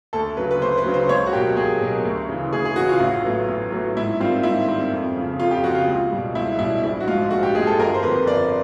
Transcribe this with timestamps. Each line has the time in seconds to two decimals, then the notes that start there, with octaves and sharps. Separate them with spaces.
0.13 D2 A4
0.37 C#3 F#3 B4
0.51 B4
0.61 D2 C5
0.78 B4
0.86 C#3 F#3
0.94 C5
1.09 C#2 C#5
1.26 F#4
1.32 B2 F#3 A#3 G4
1.57 C#2 G#4
1.81 B2 F#3 A#3
2.05 D2
2.29 C#3 E3
2.52 D2 G#4
2.65 G#4
2.76 C#3 E3 F#4
2.89 F4
3.00 A1
3.24 A2 F#3 B3
3.49 A1
3.72 A2 F#3 B3
3.96 G#2 E4
4.20 D#3 G3 C4 F4
4.38 F4
4.43 G#2 E4
4.68 D#3 G3 C4
4.92 F2
5.16 C#3 F3
5.40 F2 F4
5.51 G4
5.64 C#3 F3 F#4
5.75 F4
5.88 C#2
6.12 B2 G3
6.35 C#2 E4
6.59 B2 G3 E4
6.83 A#1 E4
7.00 F#4
7.08 G#2 F3 G#3 F4
7.30 A#1 F#4
7.43 G4
7.55 G#2 F3 G#3 G#4
7.67 A4
7.78 G1 A#4
7.94 C5
8.02 F2 D3 F3 B4
8.26 G1 D5